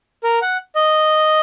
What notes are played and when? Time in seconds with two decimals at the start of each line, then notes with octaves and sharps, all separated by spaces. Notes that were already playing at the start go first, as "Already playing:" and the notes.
0.24 A#4
0.42 F#5
0.76 D#5